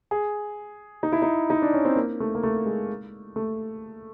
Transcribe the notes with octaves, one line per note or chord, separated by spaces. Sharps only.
G#4
D#4
E4
D#4
D#4
D4
C#4
C4
A#3
A3
A#3
A3
G#3
A3